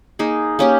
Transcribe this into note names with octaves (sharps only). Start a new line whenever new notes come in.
A#3 D#4 G#4
A#3 C#4 G4